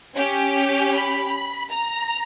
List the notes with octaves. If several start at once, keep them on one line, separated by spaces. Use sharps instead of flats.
C#4 G4
B5
A#5